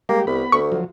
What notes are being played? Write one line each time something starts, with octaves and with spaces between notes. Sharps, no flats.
G3 G#3 A#3 G4
C2 B3 B5
D2 C#6
F3 F#3